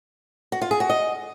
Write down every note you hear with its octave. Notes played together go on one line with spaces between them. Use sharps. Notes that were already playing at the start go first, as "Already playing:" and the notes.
F#4
F4
G#4
F#4
D#5